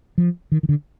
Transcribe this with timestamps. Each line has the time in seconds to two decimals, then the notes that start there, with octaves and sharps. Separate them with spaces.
0.18 F3
0.52 D#3
0.63 D#3
0.69 D3